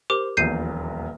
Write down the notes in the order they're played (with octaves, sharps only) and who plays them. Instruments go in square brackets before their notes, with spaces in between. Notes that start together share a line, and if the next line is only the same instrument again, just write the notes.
[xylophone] G4 A#4 D6 [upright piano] C5
[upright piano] D#1 A#1 E2 [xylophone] G6 C7 D#7